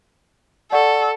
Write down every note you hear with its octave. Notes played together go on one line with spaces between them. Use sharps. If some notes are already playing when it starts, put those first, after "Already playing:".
A4 D5 F#5 C#6